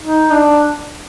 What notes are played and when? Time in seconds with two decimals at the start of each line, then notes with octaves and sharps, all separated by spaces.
0.02 D#4
0.31 D4